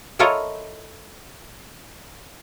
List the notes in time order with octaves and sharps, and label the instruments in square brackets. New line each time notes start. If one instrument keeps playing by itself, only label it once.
[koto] E4 F4 A4 A#4 C#5 D#5